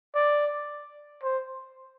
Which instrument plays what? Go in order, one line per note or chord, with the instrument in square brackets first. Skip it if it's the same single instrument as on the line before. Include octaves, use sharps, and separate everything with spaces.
[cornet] D5
C5